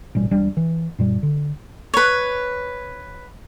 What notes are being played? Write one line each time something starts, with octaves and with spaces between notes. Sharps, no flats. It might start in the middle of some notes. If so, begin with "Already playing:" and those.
A1 A#2 G3 C#4
E1 G3 D4
E3
F#2 A#2 G3
D3
B4 C#5